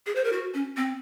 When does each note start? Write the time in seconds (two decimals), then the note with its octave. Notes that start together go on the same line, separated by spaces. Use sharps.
0.06 G#4
0.16 C5
0.24 A#4
0.33 F#4
0.54 C#4
0.77 C4